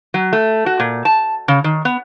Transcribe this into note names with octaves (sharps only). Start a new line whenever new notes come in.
F#3
A3
F#4
A#2
A5
C#3
D#3
B3